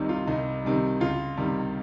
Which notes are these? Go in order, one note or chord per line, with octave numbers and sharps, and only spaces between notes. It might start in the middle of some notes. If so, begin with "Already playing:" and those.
Already playing: C2 C3 D#3 G3 D#4
F4
C2 D#4
C3 D#3 G3
C#2 F4
C3 D#3 G3